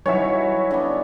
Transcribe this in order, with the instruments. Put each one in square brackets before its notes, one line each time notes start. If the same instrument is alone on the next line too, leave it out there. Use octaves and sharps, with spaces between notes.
[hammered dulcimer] E3 D#4 F#4 [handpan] F#3 G3 [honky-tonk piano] C#5 E5
[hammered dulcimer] D3 B3 [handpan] D5